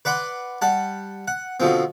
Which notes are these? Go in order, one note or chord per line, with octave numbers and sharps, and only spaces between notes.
B4 D5 F#5 C6 D6
G3 F#5 A5
F#5
B2 D3 F3 C4